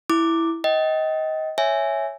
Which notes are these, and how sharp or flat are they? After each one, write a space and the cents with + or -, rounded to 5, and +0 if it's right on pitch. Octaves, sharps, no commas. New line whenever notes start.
E4 +0 D6 +0
D#5 +20 G5 -30
C#5 +0 E5 +0 G#5 +0